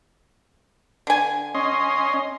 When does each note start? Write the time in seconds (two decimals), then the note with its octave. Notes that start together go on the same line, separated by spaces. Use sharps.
1.07 D3 G#5
1.54 C#4 D#5 C6